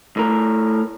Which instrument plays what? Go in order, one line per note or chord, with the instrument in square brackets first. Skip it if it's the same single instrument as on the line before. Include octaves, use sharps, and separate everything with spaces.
[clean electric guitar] A2 A#4